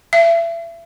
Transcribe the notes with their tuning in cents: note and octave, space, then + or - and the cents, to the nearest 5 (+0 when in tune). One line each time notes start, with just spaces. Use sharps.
E5 +30